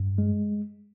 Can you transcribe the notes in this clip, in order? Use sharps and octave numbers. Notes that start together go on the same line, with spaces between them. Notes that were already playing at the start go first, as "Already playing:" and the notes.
Already playing: G2
G#3